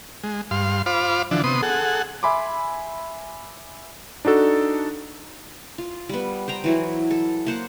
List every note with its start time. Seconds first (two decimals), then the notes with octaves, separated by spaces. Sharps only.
0.24 G#3
0.51 G2 F5 C6
0.86 F4 C5 F5 B5 D6
1.31 D3 E3 F3 D4
1.44 C3 B3 C6 D#6
1.63 G#4 A4 F#5
2.23 E5 G#5 B5 C6 D6
4.25 D4 D#4 F#4 A4
5.78 F4
6.09 G3 B3
6.48 C5 G5 A#5
6.64 E3 F#3 E4
7.11 A4
7.46 A#3 C5 F#5